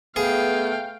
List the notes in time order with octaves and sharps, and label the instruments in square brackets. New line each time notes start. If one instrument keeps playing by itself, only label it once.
[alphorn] A3 [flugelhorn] B3 [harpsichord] G#4 [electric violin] F5 G5